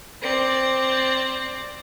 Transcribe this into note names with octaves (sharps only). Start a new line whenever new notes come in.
C4 D5